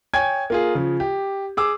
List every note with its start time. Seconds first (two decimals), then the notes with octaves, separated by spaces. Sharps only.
0.14 C#5 G5 G#5 G#6
0.50 A#3 F4 G#4
0.75 C#3 F3
1.00 G4
1.57 G#4 D6 E6